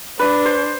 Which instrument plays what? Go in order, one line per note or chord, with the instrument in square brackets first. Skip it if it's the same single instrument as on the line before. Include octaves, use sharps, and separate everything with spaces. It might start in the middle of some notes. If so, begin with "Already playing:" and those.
[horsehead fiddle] D4 [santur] B4
[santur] C5